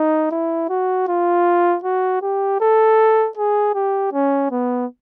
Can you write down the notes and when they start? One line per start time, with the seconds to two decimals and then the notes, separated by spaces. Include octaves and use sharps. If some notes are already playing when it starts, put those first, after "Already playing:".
Already playing: D#4
0.31 E4
0.69 F#4
1.08 F4
1.84 F#4
2.22 G4
2.60 A4
3.37 G#4
3.75 G4
4.13 C#4
4.51 B3